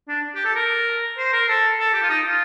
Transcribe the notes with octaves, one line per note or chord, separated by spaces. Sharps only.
D4
G4
A4
A#4
C5
A#4
A4
A4
G4
F4
D#4
F4